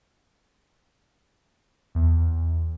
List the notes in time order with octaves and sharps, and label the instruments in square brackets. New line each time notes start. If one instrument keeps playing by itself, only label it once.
[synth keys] E2